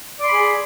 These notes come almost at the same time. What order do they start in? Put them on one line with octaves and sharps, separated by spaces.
D5 C6 B5 G#4